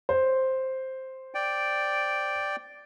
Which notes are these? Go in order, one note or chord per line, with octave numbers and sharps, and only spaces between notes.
C5
D5 G5